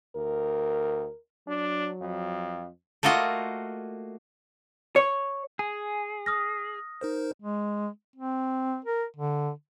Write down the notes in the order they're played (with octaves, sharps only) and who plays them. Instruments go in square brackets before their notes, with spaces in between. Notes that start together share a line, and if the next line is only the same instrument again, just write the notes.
[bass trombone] D2 [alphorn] A#4
[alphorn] F#3 [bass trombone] D4
[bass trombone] F2
[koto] A3 A#3 F4 F#4 D#5
[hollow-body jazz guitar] C#5
[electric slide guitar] G#4 [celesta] G#5
[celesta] D#6 F6 A#6
[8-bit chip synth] D#4 A#4 C5
[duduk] G#3
C4
A#4
D3